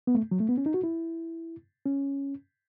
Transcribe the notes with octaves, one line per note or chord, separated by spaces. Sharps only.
B3
A3
F#3
A3
B3
C#4
D#4
F#4
E4
C#4